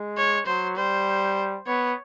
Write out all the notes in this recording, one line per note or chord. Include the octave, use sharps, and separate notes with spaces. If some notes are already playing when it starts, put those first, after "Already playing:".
Already playing: G#3
C#5
F#3 C5
G3 C5
B3 C#5